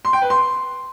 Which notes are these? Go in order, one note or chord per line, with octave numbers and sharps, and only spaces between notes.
C6
G5
B4
C6